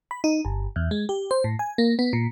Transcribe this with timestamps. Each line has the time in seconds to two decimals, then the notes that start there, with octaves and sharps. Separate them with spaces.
0.11 B5
0.24 D#4
0.45 G1
0.76 E2
0.91 G#3
1.09 G4
1.31 C5
1.44 A2
1.59 G#5
1.78 A#3
1.99 B3
2.13 A#2